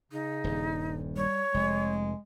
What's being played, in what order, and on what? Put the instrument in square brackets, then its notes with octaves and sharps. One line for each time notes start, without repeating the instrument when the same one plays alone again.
[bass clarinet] C#3 [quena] D#4
[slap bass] D#1 G2
[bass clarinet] G3 [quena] C#5
[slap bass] F1 [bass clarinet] G#3